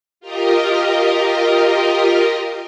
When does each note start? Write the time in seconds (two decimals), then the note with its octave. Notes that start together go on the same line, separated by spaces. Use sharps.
0.20 F4 G4 A#4 D#5